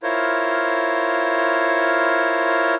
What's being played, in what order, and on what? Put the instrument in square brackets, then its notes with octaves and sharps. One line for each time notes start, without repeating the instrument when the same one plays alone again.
[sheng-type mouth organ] E4 F4 A#4 C5 C#5